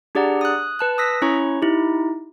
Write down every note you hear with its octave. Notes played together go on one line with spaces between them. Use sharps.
D4 G4 G#4 D5 F#5 A#5
D#6 F#6
B4 A5 F#6
D#6 E6 A#6 B6
C#4 E4 C#5 A#5 C#6
D#4 E4 G4